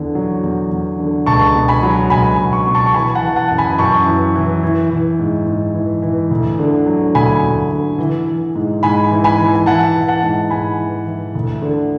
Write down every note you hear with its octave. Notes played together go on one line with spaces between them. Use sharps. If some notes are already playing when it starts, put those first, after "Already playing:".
Already playing: E2 D3
F#3
E2
E2
D3
C#2 A5 C#6
B2
G#5 B5
F#3
C#2 G#5 B5
C#2
C#6
B2
A5 C#6
C#6
E3 G#5 B5
F#5 A5
E3
F#5 A5
F#2
G#5 B5
F#2 A5 C#6
E3
E3
E3
E3
G#2
G#2
E3
E3
D2
D3
F#3
D2 G#5 B5
D2
D3
E3
E3
G#2
G#2 G#5 B5
E3
G#5 B5
E3
G#5
E3 F#5 A5
E3
F#5 A5
G#2
G#2 G#5 B5
E3
E3
D2
D3